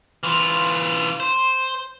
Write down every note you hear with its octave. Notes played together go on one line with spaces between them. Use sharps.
E3 F4
C5